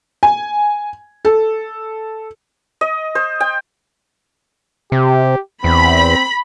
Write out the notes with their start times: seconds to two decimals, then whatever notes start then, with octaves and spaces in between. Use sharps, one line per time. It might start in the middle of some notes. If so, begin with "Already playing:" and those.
0.23 G#5
1.25 A4
2.81 D#5
3.15 C5
3.40 G5
4.92 C3 G4
5.64 E2 C4 B5